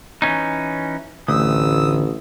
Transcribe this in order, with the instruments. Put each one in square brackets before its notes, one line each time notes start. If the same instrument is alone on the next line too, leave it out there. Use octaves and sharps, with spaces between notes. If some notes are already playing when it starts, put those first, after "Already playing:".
[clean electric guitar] E3 C#4 D#4
[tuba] A1 [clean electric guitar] D2 [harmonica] D#6 E6